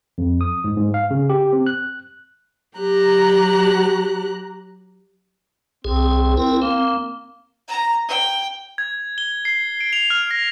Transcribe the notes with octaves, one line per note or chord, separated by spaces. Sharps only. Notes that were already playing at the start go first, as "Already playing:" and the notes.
F2
D#6
G#2
G#2
F5
C#3
G4
C4
F#6
F#3 G4 A#5 F#6
C2 C4 G#4
C4 E4 A#4
A#3 C4
A#5
G5
G#6
G7
C7
D7
F7
F6
A#6